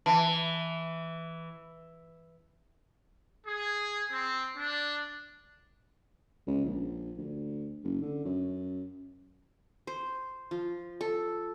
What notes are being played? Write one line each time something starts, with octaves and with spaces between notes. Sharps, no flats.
E3 A5
G#4
C4
D4
C#2
A#1
D2
F#1
D3
F#2
C5
F3
A4